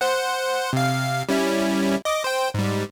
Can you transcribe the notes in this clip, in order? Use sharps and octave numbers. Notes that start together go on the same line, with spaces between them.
C5 F#5
C3 F5
G3 C#4 E4
D#5 D6
C5 G5
G#2 G3